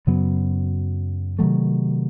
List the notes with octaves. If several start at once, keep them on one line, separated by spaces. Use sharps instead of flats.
F#2 C#3 F#3 B3
C3 D#3 F#3 A3